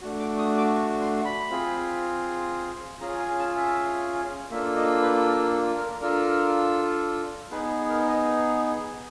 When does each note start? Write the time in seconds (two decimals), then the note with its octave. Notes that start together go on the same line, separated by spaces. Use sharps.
0.01 A3 D4 F#4
0.19 D6
0.38 D#6
0.57 D6
0.75 C#6
1.01 C6
1.25 B5
1.50 C4 F4 G#4
3.01 C#4 F4 G#4 A#5
3.20 G#5
3.39 A5
3.57 E5
4.51 A#3 D4 F4 A4 E5
4.76 D#5
5.01 B4
5.27 A#4
5.50 A4
5.76 A#4
6.01 D4 F4 A4 A#4
7.51 B3 D#4 G#4 B4
7.89 A#4
8.08 D#5